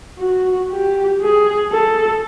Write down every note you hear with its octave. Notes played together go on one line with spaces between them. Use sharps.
F#4
G4
G#4
A4